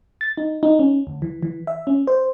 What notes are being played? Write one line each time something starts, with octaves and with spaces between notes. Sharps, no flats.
A6
D#4
D#4
C#4
D2
E3
E3
E5
C#4
C5